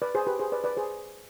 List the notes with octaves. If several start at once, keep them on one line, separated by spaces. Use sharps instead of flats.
B4 D5
G#4 C5
G4 B4
G#4 C5
B4 D5
B4 D5
G#4 C5